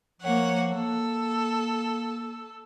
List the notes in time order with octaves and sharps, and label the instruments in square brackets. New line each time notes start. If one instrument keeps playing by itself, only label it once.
[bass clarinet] F3 [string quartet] A#3 C#5 F#5
[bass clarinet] A#3 [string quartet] A4